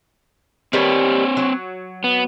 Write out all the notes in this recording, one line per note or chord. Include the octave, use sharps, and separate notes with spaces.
D#3 G3 B3 C4 C#5
F#3
B3